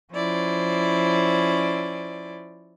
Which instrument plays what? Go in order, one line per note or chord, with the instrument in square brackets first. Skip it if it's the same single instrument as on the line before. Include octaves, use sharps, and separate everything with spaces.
[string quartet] F3 C#4 E4 C5 D5